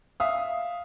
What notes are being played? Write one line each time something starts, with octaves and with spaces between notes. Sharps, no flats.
E5 F5 D#6